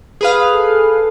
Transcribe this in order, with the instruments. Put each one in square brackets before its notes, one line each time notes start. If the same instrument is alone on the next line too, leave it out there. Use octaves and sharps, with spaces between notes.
[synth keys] G#4 B4 F5
[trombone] A4